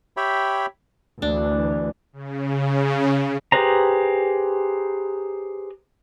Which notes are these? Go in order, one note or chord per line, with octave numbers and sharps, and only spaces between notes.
G4 C#5 E5 G5 B5
D2 E3 D4
C#3
G4 G#4 B4 C5 A#5